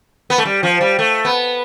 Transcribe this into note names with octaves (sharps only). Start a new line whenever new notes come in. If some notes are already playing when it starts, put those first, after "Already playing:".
B3
A3
G3
F3
G3
A3
B3